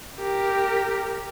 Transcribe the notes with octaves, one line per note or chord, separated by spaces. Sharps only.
G4 A#4